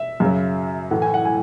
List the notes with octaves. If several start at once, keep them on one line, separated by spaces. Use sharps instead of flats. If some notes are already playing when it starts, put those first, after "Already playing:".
Already playing: E5
F#2 C#3 F#3
A2 E3 A3 F#5
G#5
F#5
G#5